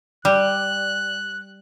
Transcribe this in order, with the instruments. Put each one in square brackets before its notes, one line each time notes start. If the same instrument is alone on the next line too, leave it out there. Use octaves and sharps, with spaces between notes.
[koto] G3 [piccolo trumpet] F#6